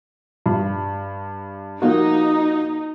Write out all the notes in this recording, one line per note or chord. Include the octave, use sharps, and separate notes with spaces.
G2
F3 A#3 D#4 F#4